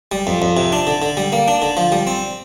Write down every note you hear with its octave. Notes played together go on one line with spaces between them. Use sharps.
G3
F2
F2
C3
D4
D3
D3
G3
A#3
D4
D3
F3
G3
C4